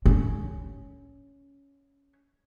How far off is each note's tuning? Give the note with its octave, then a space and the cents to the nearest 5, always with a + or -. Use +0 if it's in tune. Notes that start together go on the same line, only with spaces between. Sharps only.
C#4 +10